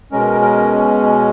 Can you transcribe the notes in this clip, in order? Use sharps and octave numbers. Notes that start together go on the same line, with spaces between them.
B2 G#3 C#4 A#4
A#4